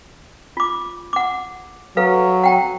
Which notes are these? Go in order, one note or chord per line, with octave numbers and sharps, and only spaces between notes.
F4 D6
F#5 D6
F#3 A4 B4 F5
F#5 G5 A#5